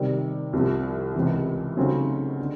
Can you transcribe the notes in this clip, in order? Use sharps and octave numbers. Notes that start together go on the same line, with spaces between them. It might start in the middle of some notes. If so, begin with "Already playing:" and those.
Already playing: C3 D#3 G3
C2 C3 F3
C#2 C3 E3
C#3 F#3 A3 C4 D#4
D3